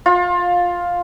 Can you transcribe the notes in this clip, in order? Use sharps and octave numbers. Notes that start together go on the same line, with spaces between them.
F4